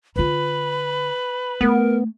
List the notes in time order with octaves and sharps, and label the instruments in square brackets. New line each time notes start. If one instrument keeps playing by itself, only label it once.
[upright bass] D3 F4 [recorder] B4 [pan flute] B5
[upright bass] A3 [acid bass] B3 [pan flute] A#4